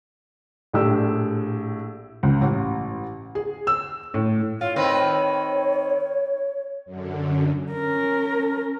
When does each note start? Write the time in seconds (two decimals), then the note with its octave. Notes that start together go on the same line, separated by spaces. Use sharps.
0.73 A#1 A2 G4 E6
2.23 C#2
2.41 A1
3.35 G#4
3.67 E6
4.14 A2
4.61 F4 C#5
4.76 D#3 C4 B4
6.86 F#2 D3
7.72 C#4 A#4